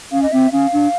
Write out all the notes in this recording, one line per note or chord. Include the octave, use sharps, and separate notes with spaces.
C#4 F5
D#5
C4 E5
C#4 F5
D4